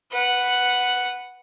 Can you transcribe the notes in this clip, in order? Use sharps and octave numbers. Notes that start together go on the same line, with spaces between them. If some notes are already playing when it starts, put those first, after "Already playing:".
B4 F#5